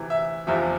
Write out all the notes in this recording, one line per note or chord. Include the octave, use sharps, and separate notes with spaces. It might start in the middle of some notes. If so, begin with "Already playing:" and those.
Already playing: D2 C3 E3
E5
F1 E2 C3 F3 E5